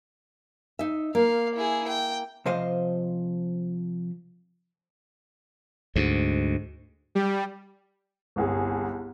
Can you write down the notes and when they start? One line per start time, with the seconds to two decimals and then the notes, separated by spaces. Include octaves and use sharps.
0.79 D#4 E5
1.15 A#3 F5
1.55 E4 G#4
1.88 G5
2.46 C3 F3 C5 D#5 F5
5.96 D2 G#2
7.15 G3
8.36 G1 C2 G#4